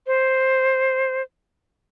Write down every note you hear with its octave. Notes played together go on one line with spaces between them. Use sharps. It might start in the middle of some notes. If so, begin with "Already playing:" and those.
C5